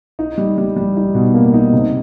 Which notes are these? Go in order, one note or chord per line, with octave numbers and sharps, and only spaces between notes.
D#4
G3
G3
G3
D#4
B2
A#3
D#4
C3